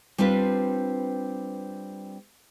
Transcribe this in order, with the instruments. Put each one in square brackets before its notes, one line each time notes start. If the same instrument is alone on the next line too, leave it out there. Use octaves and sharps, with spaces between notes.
[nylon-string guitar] G3 C4 D4 F4 B4